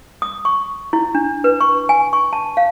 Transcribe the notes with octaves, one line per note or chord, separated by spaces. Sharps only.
D#6
C#6
E4
D4
B4
C#6
G#5
C#6
A5
F5